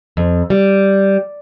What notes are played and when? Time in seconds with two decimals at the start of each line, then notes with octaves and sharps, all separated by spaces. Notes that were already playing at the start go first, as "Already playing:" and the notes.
0.17 F2
0.50 G3